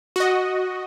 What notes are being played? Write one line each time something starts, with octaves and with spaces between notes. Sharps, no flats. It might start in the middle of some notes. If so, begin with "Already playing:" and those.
F#4 D#5